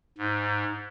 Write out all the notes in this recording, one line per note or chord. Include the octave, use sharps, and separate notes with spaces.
G#2